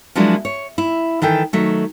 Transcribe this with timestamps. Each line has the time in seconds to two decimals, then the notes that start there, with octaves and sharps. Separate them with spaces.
0.16 F3 F#3 G#3 A#3 D4 E4
0.45 C#5
0.78 E4
1.22 D#3 E3 A4 G5
1.53 D#3 F#3 A3